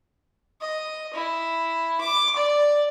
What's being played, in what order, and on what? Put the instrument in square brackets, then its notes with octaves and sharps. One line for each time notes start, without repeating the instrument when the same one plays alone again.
[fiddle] D#5
E4
D6
D5